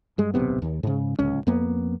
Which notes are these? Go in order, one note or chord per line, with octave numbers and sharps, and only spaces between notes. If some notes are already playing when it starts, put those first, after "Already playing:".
G2 G#3
D1 B1 C3 B3
D#2
G#2 C#3
D1 C#2 C#4
F2 A#3 B3